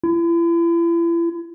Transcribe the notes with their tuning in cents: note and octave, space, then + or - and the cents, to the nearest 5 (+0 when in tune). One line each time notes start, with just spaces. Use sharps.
E4 +40